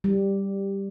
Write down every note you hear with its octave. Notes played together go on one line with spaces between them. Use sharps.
G3